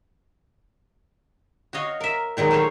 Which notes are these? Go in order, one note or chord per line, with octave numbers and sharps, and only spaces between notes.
F#4 C#5 D#5 F5
A#4 E5
A#2 D#3 F#3 G#3
A3 G#4 C5 C#5 F5